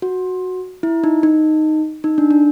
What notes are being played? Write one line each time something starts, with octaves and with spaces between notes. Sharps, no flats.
F#4
E4
D#4
D#4
D#4
D4
D4